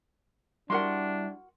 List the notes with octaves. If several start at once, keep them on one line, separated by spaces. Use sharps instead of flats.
G3 D4 E4 F#4 G4 A#4 F#5 C6